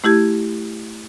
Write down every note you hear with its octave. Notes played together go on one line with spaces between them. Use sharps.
A3 E4 G4 G#6